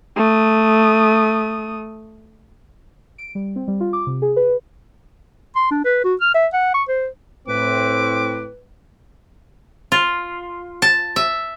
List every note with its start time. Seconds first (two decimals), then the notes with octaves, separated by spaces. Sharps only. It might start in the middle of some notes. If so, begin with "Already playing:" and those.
0.17 A3 D#6
3.18 D7
3.35 G3
3.56 C4
3.68 G3
3.80 F4
3.93 D6
4.07 C3
4.22 G#4
4.36 B4
5.56 C6
5.71 D4
5.85 B4
6.04 F#4
6.21 F6
6.34 E5
6.53 F#5
6.74 C#6
6.88 C5
7.48 A2 C4 B4 D6
9.92 F4
10.82 A5
11.16 E5